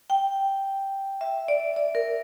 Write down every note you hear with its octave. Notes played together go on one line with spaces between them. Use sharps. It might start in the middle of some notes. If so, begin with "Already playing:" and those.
G5
E5
D5
D5
A#4